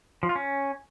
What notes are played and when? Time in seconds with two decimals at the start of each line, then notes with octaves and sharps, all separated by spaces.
0.23 F3
0.29 F4
0.36 C#4